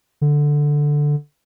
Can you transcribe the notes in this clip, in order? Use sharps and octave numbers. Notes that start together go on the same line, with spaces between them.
D3